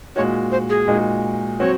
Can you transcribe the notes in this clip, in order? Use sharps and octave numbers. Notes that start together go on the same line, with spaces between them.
A#2 G#3 D#4 F#4 C#5
C5
G#4
A#2 G#3 D#4 F#4
F#3 C4 F#4 C#5